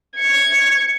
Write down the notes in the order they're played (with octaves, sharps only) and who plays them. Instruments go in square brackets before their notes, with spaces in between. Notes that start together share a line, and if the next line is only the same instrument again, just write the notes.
[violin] G#6 C#7